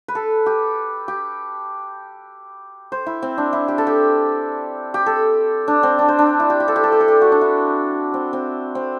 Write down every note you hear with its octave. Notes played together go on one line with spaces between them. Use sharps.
B4
A4
G4
G4
C5
E4
C4
D4
E4
G4
A4
G4
G4
A4
D4
C4
D4
C5
D4
E4
G4
G4
A4
G4
A4
G4
A4
G4
F#4
D4
E4
C4
C4
C4